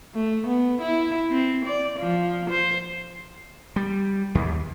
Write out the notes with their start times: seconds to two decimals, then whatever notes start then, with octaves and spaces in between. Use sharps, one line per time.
0.14 A3
0.47 B3
0.82 E4
1.31 C4
1.66 D5
1.99 F3
2.50 C5
3.76 G3
4.35 D#2